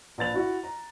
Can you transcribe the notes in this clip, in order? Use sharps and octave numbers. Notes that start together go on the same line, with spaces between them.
A#1 B4 A6 F7
E4 F#4
A#5